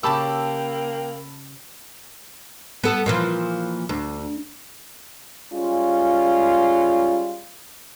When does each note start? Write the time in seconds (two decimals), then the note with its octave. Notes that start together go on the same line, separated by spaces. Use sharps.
0.03 C#3 A#3 G4 G5 A5 B5 E6
2.84 B3 A4
3.06 A#2 E3 F3
3.89 D2
5.53 G3 G#3 C#4 F4